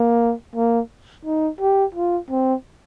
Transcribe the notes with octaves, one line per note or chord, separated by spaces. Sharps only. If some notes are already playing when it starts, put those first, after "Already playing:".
Already playing: A#3
A#3
D#4
G4
F4
C4